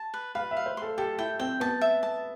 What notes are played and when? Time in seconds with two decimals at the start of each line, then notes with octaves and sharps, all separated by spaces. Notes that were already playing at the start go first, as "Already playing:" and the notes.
Already playing: A5
0.14 B4
0.35 B4 F5
0.51 E5
0.57 F5
0.66 C5
0.77 A4 C6
0.98 G4 A4
1.19 E4 G5
1.39 C4 G5
1.60 B3 A5
1.81 E5
2.03 A5